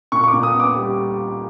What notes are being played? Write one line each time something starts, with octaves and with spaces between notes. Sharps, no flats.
A#2 C#6
C#6
D6
A#2
D#6
B3
D6
G3